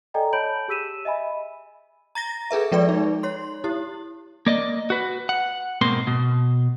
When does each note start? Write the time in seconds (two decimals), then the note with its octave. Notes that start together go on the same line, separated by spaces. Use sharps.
0.14 A4 D5 D#5 G5 G#5 A#5
0.33 C#5 A5 B5 G6 D7 F#7
0.68 G4 G#4 E6 B6 D#7 E7
1.05 D#5 E5 G#5 B5
2.15 A#5 A6 A#6
2.51 G#4 A4 B4 E5
2.72 F3 G#3 A4 B4 D5
2.89 D#4
3.23 C#5 C6
3.64 E4 G4
4.46 A#3 D5 D#5
4.90 F#4 B4
5.29 F#5
5.81 G#2 B2 A#3 C4 C6
6.07 B2